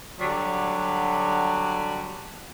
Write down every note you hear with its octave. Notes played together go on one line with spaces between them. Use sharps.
D3 F#3 G3